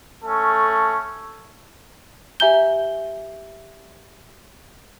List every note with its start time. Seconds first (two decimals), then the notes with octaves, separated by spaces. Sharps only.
0.24 A3 C#4 A4
2.40 G4 E5 G#5 A#5 G6 G7